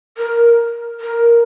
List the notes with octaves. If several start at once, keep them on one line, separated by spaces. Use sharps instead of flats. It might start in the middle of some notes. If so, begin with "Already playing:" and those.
A#4
A#4